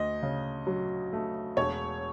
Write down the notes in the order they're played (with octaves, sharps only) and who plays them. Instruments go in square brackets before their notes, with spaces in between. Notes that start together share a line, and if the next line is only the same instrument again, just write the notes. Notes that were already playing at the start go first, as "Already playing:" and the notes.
Already playing: [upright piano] D2 [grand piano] D#5
[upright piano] C#3
F#3
A3
[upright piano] E1 [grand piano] C#5